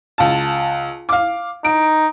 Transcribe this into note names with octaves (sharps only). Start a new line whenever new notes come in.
C#2 A5
F5 D6
D#4 D7